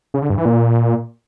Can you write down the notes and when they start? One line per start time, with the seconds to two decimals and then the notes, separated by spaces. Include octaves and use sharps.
0.14 C#3
0.22 D3
0.30 G2
0.38 E3
0.45 A#2